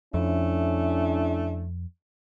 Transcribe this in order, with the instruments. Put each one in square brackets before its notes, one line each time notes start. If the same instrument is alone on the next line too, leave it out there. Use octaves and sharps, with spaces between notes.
[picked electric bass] F2 [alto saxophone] A3 [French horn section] C#4 D4 E4